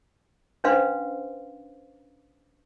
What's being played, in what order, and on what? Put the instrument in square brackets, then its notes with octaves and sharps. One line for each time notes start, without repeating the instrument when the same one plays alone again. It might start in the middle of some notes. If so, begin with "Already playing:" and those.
[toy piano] C#4 D4 B4 C5 F5 C6